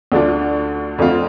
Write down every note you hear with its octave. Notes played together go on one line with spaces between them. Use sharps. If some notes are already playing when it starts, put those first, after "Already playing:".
D2 D3 A3 D4 F4
F2 D3 A3 C4 F4